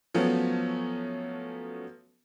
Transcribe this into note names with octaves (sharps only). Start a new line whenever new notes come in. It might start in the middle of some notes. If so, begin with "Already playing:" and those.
F3 F#3 A3 B3 C#4